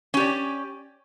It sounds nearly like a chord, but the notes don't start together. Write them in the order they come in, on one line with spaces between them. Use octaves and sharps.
C#4 G4 D5